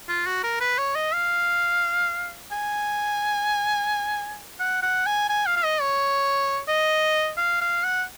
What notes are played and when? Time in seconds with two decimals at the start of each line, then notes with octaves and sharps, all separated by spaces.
0.09 F4
0.26 F#4
0.44 A#4
0.61 B4
0.78 C#5
0.95 D#5
1.13 F5
2.52 G#5
4.60 F#5
4.83 F#5
5.06 G#5
5.29 G#5
5.46 F5
5.56 F5
5.64 D#5
5.81 C#5
6.68 D#5
7.38 F5
7.61 F5
7.84 F#5